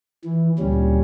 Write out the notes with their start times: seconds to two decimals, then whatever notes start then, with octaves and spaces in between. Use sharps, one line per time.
0.24 E3
0.59 D2 A#2 G3 C#4